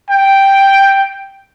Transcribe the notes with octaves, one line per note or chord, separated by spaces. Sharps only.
G5